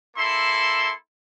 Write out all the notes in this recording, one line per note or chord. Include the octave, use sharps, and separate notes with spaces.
A#3 E4 A4 C6